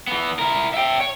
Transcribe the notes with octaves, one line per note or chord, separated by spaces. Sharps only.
E3 B3
E4 A#4
E5 G5
C#5